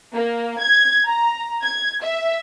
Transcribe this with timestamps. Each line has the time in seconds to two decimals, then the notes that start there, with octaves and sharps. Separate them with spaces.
0.14 A#3
0.60 G#6
1.07 A#5
1.63 G#6
2.03 E5